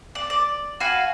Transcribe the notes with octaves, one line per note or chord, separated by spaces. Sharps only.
D5
D5
F#4 B4 F5 G#5